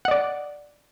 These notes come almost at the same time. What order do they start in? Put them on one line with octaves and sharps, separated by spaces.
F#5 D#5 D5